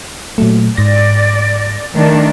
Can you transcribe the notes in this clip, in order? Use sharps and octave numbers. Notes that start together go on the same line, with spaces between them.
A#2 F#3 A3
G#2 D5 A#6
D#3 A3 D4